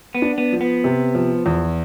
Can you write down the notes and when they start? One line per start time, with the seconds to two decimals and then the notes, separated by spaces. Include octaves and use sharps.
0.15 B3
0.22 D4
0.38 B3
0.53 F3
0.61 B3
0.84 C3
1.15 F3
1.46 E2